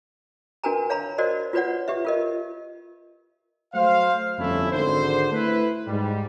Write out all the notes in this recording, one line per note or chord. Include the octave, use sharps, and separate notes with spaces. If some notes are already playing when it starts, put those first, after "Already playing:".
D4 F#4 A#4 B4 G#5 A#5
C#5 F5 A#5 B5
F#4 A#4 C5 D5 D#5
F4 F#4 B4 C#5 D5 F#5
G4 B4 E5
F4 A#4 D#5
F#3 A3 C5 F5
G1 F2 A3 C#4 E4
G#1 D3 C5
A3 E4 B4
G#2 G3